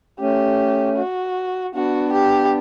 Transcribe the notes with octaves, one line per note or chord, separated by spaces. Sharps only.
A3 C#4 G4
F#4
B3 D4 F#4
G4